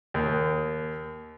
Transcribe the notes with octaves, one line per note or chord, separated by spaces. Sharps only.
D#2